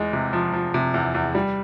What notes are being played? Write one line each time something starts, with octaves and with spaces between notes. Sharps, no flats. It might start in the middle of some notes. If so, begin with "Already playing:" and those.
Already playing: E2 G#3
C3
F3
F3
C3
E2
E2
G3